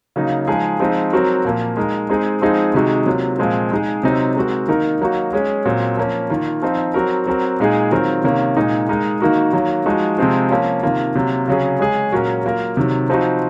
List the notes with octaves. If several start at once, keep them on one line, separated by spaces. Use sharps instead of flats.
C#3 F#3 A#3 D#4
F3 G#3 D#4 G#4
F3 G#3 C4 D#4
F#3 C4 F#4 A#4
A#2 F3 A#3
G#3 D#4 A#4
G#3 C4 D#4 G#4
F3 G#3 C4 D#4 G#4
C3 D#3 G#3 D#4 F#4
C3 F#3 A#3 F4
A#2 F3 G#3 C4
G#3 D#4 G#4
C3 F#3 C4 D#4
G#3 C4 F#4 A#4
D#3 A#3 D#4 A#4
F#3 A#3 D#4 F#4
G#3 C#4 G#4
A#2 F#3 C4
F3 A#3 C#4
D#3 A#3 F4
F3 C4 D#4
F#3 C4 F#4 A#4
F#3 C4 F#4 A#4
A#2 G#3 D#4 G#4
D#3 F#3 C4 F4 A#4
C3 D#3 A#3 C#4
A#2 G#3 D#4
G#3 D#4 A#4
D#3 A#3 D#4 F#4 A#4
D#3 F#3 A#3
F3 G#3 D#4 F#4
C3 F3 G#3 C4 F4
F3 A#3 C#4 F4
C3 D#3 A#3 F4
C3 F#3 A#3
C#3 F#3 C#4 G#4
G#3 C#4 G#4
A#2 F#3 C#4 F#4 A#4
F#3 A#3 F4 A#4
C3 D#3 F#3
F3 C4 D#4 F#4